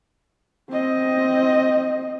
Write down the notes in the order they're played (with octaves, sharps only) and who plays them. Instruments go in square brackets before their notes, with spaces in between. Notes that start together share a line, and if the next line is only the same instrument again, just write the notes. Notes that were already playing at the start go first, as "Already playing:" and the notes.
[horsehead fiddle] C4 D#5